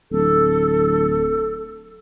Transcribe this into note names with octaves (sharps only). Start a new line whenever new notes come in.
D1 A4